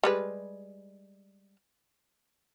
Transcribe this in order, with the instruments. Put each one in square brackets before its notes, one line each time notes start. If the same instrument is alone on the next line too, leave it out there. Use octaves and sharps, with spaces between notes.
[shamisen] G3 G#3 B4